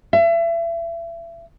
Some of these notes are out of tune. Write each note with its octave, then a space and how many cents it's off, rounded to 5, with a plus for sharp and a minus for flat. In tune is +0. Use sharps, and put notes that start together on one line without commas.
E5 +35